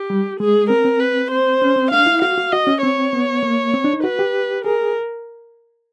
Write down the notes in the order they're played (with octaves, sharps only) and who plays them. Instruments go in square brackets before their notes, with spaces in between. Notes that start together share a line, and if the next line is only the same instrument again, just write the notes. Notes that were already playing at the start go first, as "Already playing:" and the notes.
Already playing: [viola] G4
[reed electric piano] G3
[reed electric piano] G#3 [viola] G#4
[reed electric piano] C4 [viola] A#4
[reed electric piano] C4
[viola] B4
C5
[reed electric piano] C#4
C4
[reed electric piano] D4 [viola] F5
[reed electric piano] E4
[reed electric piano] F#4 [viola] F5
[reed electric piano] F#4
[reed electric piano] F#4 [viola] D#5
[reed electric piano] C#4
[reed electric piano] C4 [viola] C#5
[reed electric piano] B3
A#3
C4
D4
D#4
[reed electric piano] F#4 [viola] B4
[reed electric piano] G4
[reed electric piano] G#4 [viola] A#4